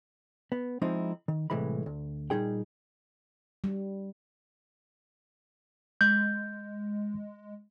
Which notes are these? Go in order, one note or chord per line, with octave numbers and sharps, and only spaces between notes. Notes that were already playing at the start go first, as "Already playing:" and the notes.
B3
F3 G#3 C4 D#4 E4
D#3
C2 F2 A2 E3 G#3 B5
D2
A#2 G3 D#4 G#4 G5
G3
G#3 G6